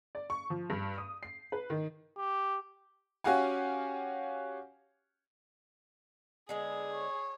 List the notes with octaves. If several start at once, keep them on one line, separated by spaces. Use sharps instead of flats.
D5
C#6
F3
G2
D#6
C7
B4
D#3
G4
C#4 F#4 G4 F5 F#5 G#5
D3 G#3 B3 G#4
C#5